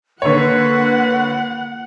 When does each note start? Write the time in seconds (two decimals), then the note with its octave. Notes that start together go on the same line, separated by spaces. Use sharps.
0.22 D3 A#3 B4 C#5 F#5 B5